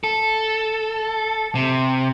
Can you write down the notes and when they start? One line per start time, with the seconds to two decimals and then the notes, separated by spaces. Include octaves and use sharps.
0.04 A4
1.55 C3